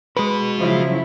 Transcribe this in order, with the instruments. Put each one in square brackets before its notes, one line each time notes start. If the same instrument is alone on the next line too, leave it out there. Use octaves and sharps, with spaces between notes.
[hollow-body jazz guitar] G#3 B4 [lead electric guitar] F#4 B5
[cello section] C#3 F#3 E4 [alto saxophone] F3